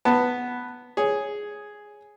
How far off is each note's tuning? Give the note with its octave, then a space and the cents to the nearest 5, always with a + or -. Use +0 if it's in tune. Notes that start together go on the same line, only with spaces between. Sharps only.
B3 +0 A5 +20
G#4 +0 C#5 +0